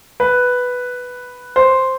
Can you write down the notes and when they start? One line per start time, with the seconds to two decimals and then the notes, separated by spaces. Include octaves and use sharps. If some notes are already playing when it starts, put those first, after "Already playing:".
0.20 B4
1.56 C5